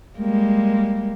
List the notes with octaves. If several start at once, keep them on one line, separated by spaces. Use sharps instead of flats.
G3 G#3 A#3